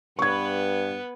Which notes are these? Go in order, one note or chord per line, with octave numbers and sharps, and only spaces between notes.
G2 B3 B4 C#6 G#6